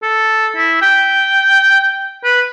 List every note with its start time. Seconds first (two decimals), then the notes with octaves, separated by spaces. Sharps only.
0.03 A4
0.56 E4
0.82 G5
2.24 B4